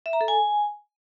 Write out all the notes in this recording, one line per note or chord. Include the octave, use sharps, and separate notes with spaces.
E5
A#5
A4
G#5